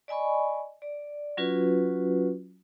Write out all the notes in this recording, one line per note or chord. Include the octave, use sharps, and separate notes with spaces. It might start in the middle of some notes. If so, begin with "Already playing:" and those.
D5 D#5 G#5 B5 C#6
D5
F#3 C#4 F4 F#4 B4